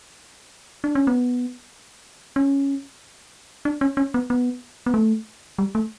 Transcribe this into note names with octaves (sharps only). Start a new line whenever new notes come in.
D4
C#4
B3
C#4
D4
C#4
C#4
B3
B3
B3
A3
G3
A3